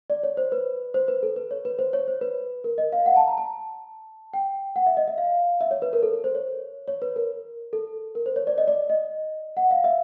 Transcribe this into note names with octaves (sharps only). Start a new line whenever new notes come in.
D5
C#5
C5
B4
C5
B4
A4
B4
C#5
B4
C5
C#5
C5
B4
A#4
D#5
F5
F#5
A5
A#5
A5
G5
F#5
E5
D#5
E5
F5
E5
C#5
B4
A#4
A4
A#4
C5
C#5
C#5
B4
A#4
A4
A#4
C5
C#5
D5
D#5
D5
D#5
F#5
F5
E5